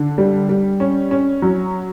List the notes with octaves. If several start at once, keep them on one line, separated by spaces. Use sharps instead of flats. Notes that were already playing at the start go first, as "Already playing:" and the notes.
Already playing: D3
G3
G3
C#4
C#4
F#3